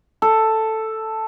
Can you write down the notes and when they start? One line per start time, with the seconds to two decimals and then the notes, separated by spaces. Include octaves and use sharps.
0.22 A4